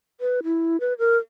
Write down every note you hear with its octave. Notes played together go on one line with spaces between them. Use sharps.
B4
E4
B4
A#4